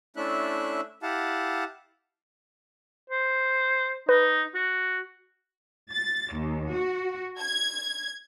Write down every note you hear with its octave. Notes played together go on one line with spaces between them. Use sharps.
A3 C#4 D4 E4 E5 F#6
E4 G4 F5 F#5 A5
C5
D#4 B4
F#4
A6
D#2
F#4
G#6